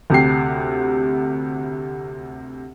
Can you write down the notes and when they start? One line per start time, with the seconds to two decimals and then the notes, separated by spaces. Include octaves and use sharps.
0.10 D2 C3 G4 C7